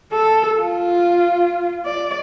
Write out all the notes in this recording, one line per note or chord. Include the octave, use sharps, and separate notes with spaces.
A4
F4
D5